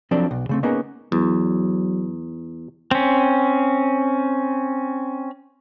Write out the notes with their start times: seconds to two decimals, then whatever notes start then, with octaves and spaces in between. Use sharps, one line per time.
0.11 F3 F#3 C4 D4 A4 D5
0.31 B1
0.49 C#3 A3 C4
0.63 A#3 B3 C#4 D#4 G#4 A#4
1.12 E2 F#3
2.91 C4 C#4